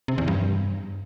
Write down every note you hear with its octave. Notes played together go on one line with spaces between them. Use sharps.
C3
E2
G2